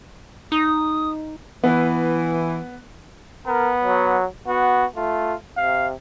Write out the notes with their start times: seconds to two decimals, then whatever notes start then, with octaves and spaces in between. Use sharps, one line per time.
0.52 D#4 D#6
1.64 E3 B3
3.47 B3 A#4
3.84 F#3
4.47 B3 F#4
4.96 A3 F4
5.57 C3 F5